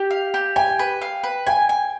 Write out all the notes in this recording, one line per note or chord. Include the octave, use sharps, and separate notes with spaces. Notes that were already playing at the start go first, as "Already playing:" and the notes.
Already playing: G4
F5
G4
G5 G#5
B4
F5
B4
G5 G#5
G#5